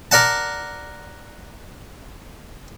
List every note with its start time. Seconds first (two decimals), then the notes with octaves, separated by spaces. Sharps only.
0.11 A#4 D5 F#5 A5